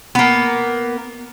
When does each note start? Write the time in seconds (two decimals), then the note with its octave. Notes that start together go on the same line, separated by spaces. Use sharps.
0.15 A#3 B3